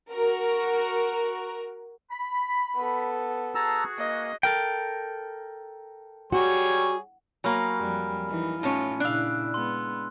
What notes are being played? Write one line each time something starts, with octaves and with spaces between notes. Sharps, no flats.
F#4 A#4
B5
B3 A4
F#4 G#4 A5 A#5 E6
A#3 D#5
A4 A#4 G5
G3 F#4 G#4 C#5
F#3 A#3 G#5 B5 F6
F2 G3
E3 D#4
A2 C#4 D#4 F4
A#2 C#3 D4 E4 F5 E6 F#6
G#3 B3 C6